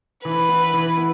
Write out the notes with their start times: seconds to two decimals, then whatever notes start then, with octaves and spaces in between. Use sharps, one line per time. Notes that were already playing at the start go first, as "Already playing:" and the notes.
0.25 E3 B4
0.49 B3 E4
0.74 E3
0.97 B3 E4